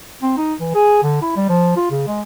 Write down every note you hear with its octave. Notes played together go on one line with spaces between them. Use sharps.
C4
D#4
E3
G#4
D3
E4
G3
F3
F4
C#3
G#3